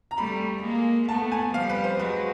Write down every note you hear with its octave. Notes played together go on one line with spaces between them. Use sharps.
A#5
G3 A3 B5
G#3 A#3
A3 B3 A5
G#5
F3 G3 F5
B4
C5
F#3 G#3 B4